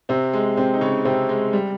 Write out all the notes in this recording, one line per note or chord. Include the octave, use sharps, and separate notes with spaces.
C3 C4
G#3
C3 C4
D#4
C#3 C#4
C3 C4
G#3
G3